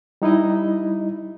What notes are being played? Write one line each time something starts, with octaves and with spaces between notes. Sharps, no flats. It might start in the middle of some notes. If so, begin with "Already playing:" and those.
G3 D#4 E4 D#5